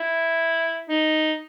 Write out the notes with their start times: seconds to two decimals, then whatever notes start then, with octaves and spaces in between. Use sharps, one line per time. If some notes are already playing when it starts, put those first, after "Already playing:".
Already playing: E4
0.89 D#4